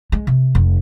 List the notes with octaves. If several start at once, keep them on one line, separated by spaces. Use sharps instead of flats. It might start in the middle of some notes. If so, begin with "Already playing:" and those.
G#3
C3
F1